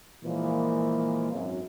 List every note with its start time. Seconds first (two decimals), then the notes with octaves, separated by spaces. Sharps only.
0.23 A#2 E3 F3 G#3 A#3
1.31 G#1 F#2